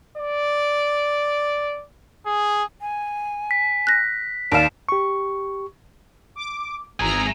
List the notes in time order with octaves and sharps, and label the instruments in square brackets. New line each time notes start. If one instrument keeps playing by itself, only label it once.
[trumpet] D5
G#4
[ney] G#5
[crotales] B6
[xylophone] F#6 A#6
[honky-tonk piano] D#2 F5 [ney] D5 [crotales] D7 E7
[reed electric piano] G4 C#6
[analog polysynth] D6
[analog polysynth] G#1 A#5 [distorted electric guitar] E3 G#4